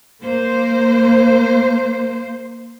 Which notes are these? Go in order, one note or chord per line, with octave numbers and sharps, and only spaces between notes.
A#3 C5